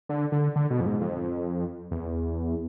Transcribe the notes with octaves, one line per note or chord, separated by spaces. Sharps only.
D3
D3
D3
B2
F2
G#2
F2
E2